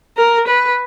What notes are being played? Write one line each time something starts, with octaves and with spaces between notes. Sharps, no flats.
A#4
B4